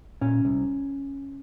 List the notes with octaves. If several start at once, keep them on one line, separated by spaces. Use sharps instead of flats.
A#2 C#4
C2